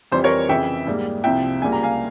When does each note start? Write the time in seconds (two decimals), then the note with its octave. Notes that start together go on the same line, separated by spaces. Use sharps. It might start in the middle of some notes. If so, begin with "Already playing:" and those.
0.11 F2 E3 G3 C5
0.24 A#4 C#5
0.49 F2 C#3 E3 E5 G5
0.87 G#2 G3 A#3
1.24 C2 C3 F3 E5 G5
1.62 C#2 C#3 G3 A#3 G#5
1.72 A#5
1.83 F5 G#5